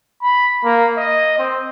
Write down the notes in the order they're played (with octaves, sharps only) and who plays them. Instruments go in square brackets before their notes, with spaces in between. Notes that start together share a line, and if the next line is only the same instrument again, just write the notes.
[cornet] B5
A#3
D#5
C4